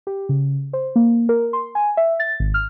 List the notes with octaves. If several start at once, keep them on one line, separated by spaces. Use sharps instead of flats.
G4
C#3
C5
A#3
A#4
C6
G#5
E5
A6
G#1
F6